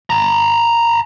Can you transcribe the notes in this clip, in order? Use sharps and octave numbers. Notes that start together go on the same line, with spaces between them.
A5 A#5